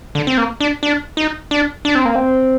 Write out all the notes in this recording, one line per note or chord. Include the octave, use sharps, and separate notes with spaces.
D3
C4
A#3
D4
D4
D#4
D4
D4
C4
A#3
C4